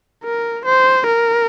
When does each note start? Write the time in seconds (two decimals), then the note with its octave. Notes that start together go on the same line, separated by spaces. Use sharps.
0.24 A#4
0.65 C5
1.06 A#4